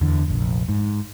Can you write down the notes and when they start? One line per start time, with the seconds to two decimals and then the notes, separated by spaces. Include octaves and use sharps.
0.01 E2 D3
0.28 F1 A#1
0.69 G#2